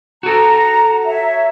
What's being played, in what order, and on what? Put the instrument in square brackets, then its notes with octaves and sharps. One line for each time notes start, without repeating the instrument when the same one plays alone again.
[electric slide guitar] F#4 A4 [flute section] A#5
[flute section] C#5 E5